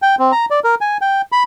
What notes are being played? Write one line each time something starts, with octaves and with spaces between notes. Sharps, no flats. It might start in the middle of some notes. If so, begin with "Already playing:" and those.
G5
C4
A#5
D5
A#4
G#5
G5
B5